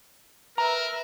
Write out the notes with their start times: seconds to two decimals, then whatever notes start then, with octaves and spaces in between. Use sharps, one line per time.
0.58 A#4 B4 E5 A#5